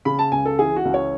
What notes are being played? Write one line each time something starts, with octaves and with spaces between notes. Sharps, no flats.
C#3 B5
A5
C#2 G#5
A4
E3 G#4
F#4
C#2
C#5